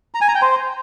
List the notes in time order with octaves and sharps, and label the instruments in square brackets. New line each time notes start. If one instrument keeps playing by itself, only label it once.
[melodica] A#5
G#5
A#5
G5
C5